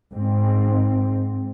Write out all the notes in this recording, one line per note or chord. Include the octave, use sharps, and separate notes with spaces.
G#2 C4